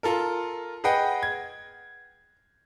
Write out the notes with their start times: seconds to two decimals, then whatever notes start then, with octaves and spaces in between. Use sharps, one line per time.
0.03 F4 A4 A#4
0.84 G#4 B4 D#5 F#5 G5
1.23 G#6